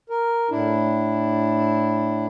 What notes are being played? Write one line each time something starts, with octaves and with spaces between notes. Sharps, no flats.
A#4
A2 D4 E4